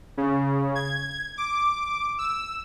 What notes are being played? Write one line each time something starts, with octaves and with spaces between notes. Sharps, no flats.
C#3
G#6
D6
E6